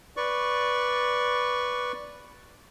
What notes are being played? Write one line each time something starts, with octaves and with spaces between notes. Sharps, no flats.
B4 D5 C#6